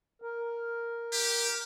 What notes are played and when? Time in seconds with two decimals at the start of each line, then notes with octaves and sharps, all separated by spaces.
0.22 A#4
1.13 G4